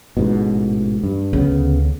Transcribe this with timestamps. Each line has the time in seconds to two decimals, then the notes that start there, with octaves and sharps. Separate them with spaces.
0.17 A1 G#2 B2
1.03 G2
1.33 D2 C#3 B3